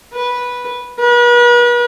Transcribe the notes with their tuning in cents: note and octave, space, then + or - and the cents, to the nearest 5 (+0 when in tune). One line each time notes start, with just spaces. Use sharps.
B4 -10
B4 -40